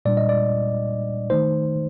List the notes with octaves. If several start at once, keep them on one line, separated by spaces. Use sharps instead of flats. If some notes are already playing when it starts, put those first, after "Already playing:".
A#2 G3 D4 D5
D#5
D5
D#3 A3 D#4 C5